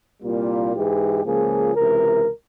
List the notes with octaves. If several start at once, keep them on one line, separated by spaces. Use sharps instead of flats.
C2 A#2 G3 A#3 F4
G#2 E3 G#3 G4
C#2 C#3 F3 A#3 G#4
C#2 C3 E3 A#4